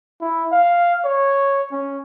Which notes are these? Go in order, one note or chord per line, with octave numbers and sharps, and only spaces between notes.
E4
F5
C#5
C#4